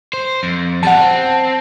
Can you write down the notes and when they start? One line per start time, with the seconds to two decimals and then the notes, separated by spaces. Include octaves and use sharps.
0.13 C5
0.43 F2
0.83 E2 G3 F#5 A5
1.01 C4